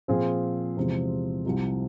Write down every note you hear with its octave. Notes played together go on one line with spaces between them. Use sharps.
A#2 F3 C4 F4 G#4
E2 C3 F3 G#3 C4
C2 C3 F3